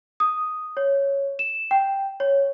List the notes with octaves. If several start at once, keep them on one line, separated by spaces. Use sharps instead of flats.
D#6
C#5
E7
G5
C#5